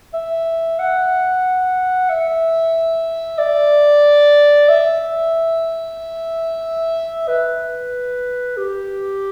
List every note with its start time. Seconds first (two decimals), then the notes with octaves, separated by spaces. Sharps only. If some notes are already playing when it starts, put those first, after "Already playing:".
0.14 E5
0.79 F#5
2.09 E5
3.38 D5
4.69 E5
7.28 B4
8.57 G4